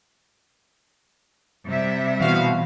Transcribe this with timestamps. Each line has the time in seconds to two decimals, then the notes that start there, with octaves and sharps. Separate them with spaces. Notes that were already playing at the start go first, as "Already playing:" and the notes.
1.67 C3 G3 E5
2.20 B2 E3 B3 F4 F#4 F5